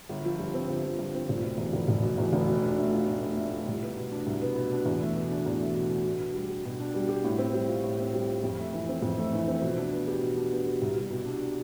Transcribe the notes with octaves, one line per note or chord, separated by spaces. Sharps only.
G1
F3
G2
C4
G1
F3
G2
C4
F1
B2
E2
F1
F1
B2
E2
F1
B2
D4
A3
F4
B2
D4
A3
F4
C2
B3
B2
D4
C2
B3
B2
D4
E2
A3
B2
D4
E2
A3
B2
D4
B2
D4
G3
G4
B2
D4
G3
G4
A2
C4
G3
F4
A2
C4
G3
F4
F2
A3
E3
C4
F2
A3
E3
C4
B2
D4
B3
G4
B2
D4
B3
G4
C2
G3
B2
D4